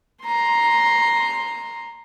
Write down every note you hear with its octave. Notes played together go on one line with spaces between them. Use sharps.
A#5 C6